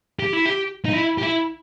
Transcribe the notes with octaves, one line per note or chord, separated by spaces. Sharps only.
G4
E4
G4
D#4
E4
G4
E4